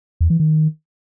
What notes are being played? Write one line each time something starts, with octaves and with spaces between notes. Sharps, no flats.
E2
E3
D#3